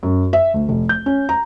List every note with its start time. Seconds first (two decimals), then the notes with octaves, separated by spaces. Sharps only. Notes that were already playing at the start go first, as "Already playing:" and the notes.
0.03 F#2
0.33 E5
0.54 D2
0.69 F1
0.89 G6
1.06 C#4
1.29 A#5